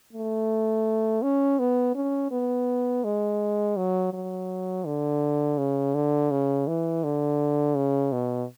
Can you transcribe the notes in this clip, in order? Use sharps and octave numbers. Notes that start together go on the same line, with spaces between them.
A3
C#4
B3
C#4
B3
G#3
F#3
F#3
D3
C#3
D3
C#3
E3
D3
C#3
B2